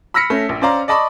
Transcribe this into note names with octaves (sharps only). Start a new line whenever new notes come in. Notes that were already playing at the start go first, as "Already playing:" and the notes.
B5 E6 F6 A#6 B6 C#7
A3 C#4
A#1
C#4 C5 D5 F5 A#5 C6
D5 D#5 A5 B5 C#6 D6